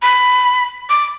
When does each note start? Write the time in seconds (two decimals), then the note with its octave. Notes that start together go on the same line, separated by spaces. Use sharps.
0.02 B5
0.89 D6